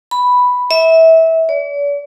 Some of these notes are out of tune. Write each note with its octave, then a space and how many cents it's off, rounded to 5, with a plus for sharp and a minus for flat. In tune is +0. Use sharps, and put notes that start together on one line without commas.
B5 +0
E5 -25
D5 -45